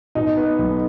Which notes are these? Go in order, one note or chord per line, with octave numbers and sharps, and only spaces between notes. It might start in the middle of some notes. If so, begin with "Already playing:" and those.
B2 D#4
B3
B1